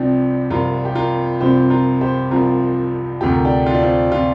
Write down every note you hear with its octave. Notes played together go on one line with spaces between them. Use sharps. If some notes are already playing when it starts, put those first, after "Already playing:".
Already playing: C2 C3 F3 D4 G4
C2 C3 F3 F4 A#4
G4
F4 A#4
C2 C3 F3 G4 C5
F4 A#4
G4 C5
C2 C3 F3 F4 A#4
D2 C3 F3 G4
A#4
D4 G4
F4
D4
C4 F4
C3 F3 F4